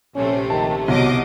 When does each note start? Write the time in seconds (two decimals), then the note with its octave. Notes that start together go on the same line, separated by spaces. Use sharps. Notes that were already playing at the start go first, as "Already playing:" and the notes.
0.15 A#1 C3 A3 C#4
0.50 D#3 A5
0.88 C2 B2 F#3 D#5 D6